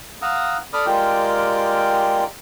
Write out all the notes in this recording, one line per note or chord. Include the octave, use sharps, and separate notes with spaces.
F5 F#5 A#5 D#6 E6
A4 D5 B5 D6 D#6 F6
G#3 F4 G4 A#4 D5 G5